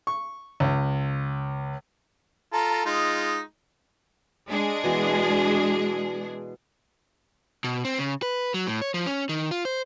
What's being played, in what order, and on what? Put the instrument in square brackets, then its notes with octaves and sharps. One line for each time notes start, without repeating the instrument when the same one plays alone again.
[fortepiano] C#6
C#2
[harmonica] F4 A4 A#5
G#3 D#4 F4
[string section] G#3 D4 G#4
[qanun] B2 E3 F#4
[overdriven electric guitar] B2
C4
C#3
B4
F#3
A2
C#5
F3
C#4
D#3
F4
C5